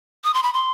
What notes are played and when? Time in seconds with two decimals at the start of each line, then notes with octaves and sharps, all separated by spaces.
0.24 D#6
0.34 C6
0.43 B5
0.54 C6